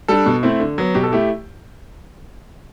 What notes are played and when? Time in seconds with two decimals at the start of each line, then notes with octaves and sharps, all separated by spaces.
0.08 G3 D4 A4
0.26 B2
0.43 A3 C4 E4
0.60 D3
0.78 F#3 B3
0.94 B2 G4
1.03 A4
1.12 A3 E4 G4